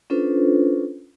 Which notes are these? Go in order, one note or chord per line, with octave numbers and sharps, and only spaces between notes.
C#4 D4 F4 A4 B4 C5